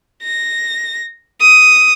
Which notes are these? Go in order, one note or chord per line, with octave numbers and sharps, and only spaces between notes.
A#6
D#6